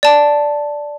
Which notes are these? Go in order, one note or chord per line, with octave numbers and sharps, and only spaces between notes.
D5 A5